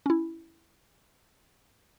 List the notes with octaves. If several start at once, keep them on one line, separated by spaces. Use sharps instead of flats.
C#4 E4